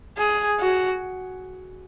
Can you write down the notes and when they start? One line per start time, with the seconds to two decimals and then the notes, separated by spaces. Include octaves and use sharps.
0.17 G#4
0.59 F#4